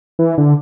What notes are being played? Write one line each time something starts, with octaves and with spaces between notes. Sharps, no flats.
E3
D3